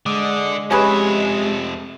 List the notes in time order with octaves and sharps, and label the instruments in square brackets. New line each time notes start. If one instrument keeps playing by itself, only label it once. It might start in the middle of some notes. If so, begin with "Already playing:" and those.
[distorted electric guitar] D3 [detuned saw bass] G#3 [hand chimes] D6 D#6
[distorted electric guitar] F2 E5 [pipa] C#4 G#4 B4 [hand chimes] G4